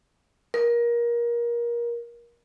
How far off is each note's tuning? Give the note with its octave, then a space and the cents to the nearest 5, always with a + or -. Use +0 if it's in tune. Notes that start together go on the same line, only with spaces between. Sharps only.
A#4 +25